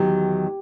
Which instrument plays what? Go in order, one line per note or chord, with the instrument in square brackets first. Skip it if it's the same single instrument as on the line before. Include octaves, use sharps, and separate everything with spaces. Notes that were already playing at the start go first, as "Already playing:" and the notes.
Already playing: [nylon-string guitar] E2 D#3 F#3 [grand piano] G4